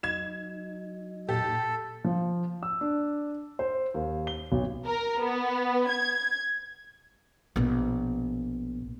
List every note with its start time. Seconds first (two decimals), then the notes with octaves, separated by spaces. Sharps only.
0.03 F#3 D#4 G#6 E7
1.29 A#2 G4 A4
2.05 F3
2.63 E6
2.81 D4
3.59 C5
3.94 D#2
4.27 G7
4.52 B1
4.86 A#4
5.21 B3
5.89 G#6
7.56 A#1 B2